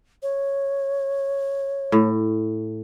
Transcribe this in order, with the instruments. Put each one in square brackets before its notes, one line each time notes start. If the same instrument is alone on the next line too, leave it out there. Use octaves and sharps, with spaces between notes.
[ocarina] C#5
[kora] A2